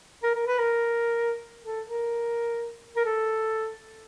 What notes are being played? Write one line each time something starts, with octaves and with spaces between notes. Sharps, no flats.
A#4
A#4
B4
A#4
A4
A#4
A#4
A4